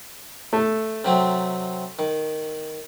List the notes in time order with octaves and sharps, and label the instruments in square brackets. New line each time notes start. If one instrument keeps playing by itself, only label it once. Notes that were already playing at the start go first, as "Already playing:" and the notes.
[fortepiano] A3
[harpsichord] C3 F#3 C4
D#3